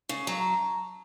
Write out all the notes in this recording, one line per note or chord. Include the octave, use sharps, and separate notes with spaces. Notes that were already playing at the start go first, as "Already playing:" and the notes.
C#3
F#3 A5
A#5